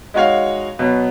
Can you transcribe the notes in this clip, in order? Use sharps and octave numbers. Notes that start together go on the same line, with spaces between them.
G#3 D#4 F#4 C#5 F5
B2 F#3 B3